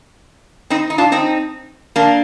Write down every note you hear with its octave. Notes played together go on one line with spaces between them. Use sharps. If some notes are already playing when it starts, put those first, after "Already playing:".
C4 D#4
D#4
D4 F4
C4 D#4
A#3 D4